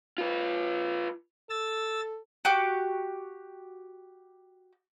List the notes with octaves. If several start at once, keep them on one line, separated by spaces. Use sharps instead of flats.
F4 B4
A4 E6 A6
F#4 G4 D6